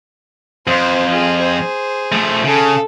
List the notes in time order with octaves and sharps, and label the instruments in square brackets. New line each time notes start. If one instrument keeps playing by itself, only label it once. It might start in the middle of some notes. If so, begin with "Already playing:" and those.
[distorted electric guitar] F2 [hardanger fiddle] C5
[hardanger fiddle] F4 G#4
G#4 C5
[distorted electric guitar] F3 A3
[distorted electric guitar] C#3 [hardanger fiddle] A4